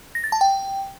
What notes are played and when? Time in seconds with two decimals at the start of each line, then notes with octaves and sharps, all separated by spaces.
0.15 A#6
0.24 A6
0.32 A5
0.41 G5